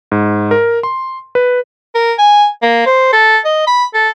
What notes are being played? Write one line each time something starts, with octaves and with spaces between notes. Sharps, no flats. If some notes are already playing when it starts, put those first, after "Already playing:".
G#2
A#4
C6
B4
A#4
G#5
A#3
C5
A4
D#5
B5
A4